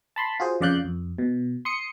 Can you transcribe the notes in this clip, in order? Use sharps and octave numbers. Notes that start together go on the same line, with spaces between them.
A5 B5 C6
F4 F#4 G#4 C5
F2 C#3 D5 F5 F#6 G6
F2
B2
C6 D#6 C#7